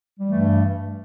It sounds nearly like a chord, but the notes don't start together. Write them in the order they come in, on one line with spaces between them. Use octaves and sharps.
G3 E3 A3 G2